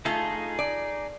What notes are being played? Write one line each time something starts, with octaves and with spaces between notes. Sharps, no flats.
A3 D#4 F4 G#4 A4
D5